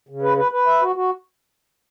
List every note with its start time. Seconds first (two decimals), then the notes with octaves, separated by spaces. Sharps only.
0.09 C#3
0.23 B4
0.37 B4
0.52 B4
0.66 E5
0.82 F#4
0.96 F#4